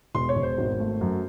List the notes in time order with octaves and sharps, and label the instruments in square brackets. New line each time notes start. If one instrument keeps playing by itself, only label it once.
[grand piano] E1 C6
C#5
E1
C5
G#1
A3
F#2